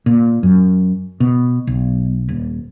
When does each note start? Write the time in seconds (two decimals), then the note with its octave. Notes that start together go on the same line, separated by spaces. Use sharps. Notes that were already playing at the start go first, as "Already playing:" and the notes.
0.06 A#2
0.43 F#2
1.20 B2
1.67 B1
2.29 D#1